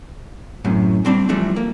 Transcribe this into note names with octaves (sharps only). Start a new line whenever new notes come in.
F#2 A2 C3
G3 C4 D4
E3 F3 G3 A3 D4
A#3